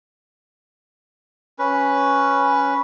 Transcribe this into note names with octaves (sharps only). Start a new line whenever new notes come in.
C#4 B4